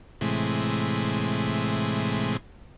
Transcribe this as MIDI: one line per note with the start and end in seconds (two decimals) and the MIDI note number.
0.21 2.37 45
0.21 2.37 48
0.21 2.37 52
0.21 2.37 56